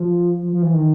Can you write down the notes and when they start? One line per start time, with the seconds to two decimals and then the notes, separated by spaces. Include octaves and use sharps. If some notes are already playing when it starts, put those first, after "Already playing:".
Already playing: F3
0.42 F3
0.53 F3
0.63 E3
0.74 D#3